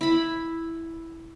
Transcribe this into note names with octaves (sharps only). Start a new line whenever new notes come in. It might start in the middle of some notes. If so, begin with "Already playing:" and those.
E4 B5